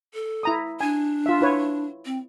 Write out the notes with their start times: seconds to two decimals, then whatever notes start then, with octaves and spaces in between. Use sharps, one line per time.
0.14 A4
0.43 E4 A#5 D#6
0.80 D4 G#5
1.26 F4 E5
1.41 E4 B4 C#5
2.05 C4